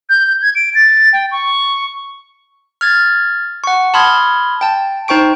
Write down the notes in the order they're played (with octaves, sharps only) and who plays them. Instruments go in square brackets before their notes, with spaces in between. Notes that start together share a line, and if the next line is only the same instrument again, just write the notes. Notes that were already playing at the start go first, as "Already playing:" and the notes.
[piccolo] G6
G#6
D7
A6
G5
C#6
[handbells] F6 G#6 A6
F#5 C#6
A5 B5 C6 D#6 F6 G#6
G5 A5
D#4 C5 G5 C#6 D7